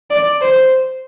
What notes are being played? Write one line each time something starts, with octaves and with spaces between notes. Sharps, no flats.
D5
C5